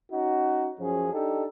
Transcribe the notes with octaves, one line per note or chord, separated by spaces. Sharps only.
C#4 D#4 F#4
F#2 F3 C#4 G#4
D4 D#4 G4 A4